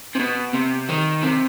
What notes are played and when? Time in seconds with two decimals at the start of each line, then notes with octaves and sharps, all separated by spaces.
0.15 C3
0.19 B2
0.54 C3
0.89 D#3
1.23 C3